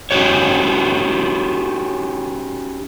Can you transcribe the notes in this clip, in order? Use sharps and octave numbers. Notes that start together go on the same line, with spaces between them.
C#4 D#4 F#4 G4 C#5